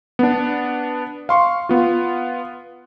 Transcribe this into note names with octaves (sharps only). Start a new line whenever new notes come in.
B3 D4
F5 C6 C#6
B3 F4